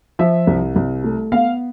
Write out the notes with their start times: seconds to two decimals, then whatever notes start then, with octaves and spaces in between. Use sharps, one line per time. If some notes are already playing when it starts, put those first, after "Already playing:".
0.19 F3 E5
0.47 C2
0.76 C2
1.04 A3
1.32 B3 F5